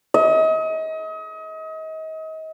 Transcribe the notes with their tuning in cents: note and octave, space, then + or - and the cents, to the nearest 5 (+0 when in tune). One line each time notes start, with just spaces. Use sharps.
D#5 +35